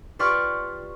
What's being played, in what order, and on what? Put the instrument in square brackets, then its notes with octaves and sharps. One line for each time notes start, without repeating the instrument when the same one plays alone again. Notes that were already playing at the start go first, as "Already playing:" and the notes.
[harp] F4 G4 B4 D5 C#6 F6